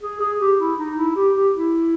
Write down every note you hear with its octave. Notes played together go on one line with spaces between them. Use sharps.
G#4
G#4
G4
E4
D#4
E4
G4
G4
E4